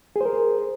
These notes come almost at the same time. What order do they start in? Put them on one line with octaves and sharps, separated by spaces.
G#4 C5 A#4